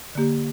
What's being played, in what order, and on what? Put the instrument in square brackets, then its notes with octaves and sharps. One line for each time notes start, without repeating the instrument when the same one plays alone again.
[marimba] D3 A#3 G4